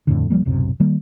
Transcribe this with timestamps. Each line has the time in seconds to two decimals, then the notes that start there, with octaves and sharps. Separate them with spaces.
0.07 D#1 F2 A2 D3
0.30 D#1 F3 G3 A#3
0.45 D1 B1 F#2 C3
0.80 D#3 G3 A#3